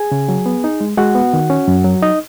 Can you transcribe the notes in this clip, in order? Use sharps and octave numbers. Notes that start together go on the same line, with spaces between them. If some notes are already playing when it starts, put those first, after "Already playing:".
Already playing: G#4 G#5
C#3
F#3
B3
D#4
G#3
G#3 F#4 F#5
B3
D#3
C#4
F#2
F#3
D#4 D#5